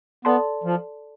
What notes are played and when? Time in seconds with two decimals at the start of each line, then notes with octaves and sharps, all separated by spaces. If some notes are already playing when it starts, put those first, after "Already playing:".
0.25 B3 A4 D5 A5 C6
0.64 F3